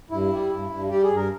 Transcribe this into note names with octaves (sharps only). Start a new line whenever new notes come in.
G2 E4
G3
G2
G2
G3 G4
G#4
G2
A#4